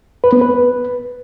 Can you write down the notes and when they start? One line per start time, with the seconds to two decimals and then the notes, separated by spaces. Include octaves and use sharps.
0.24 B4
0.33 B3
0.41 B4